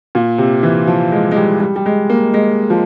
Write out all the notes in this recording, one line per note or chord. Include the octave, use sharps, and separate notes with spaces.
A#2
C3
E3
F3
G#3
G#3
G3
G3
G3
G#3
A#3
G#3
F3